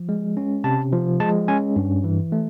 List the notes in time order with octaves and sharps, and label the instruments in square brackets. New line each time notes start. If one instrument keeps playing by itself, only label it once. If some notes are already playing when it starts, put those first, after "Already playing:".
Already playing: [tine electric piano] F3
G#3
C#4
C3 A5
F3
G#3 A5
C#4 G#5
G2
E3
A3